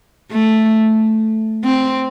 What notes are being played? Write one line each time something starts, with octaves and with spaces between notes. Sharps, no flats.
A3
C4